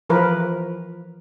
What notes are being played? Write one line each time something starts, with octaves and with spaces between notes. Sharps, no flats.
E3 F3 A#4 B4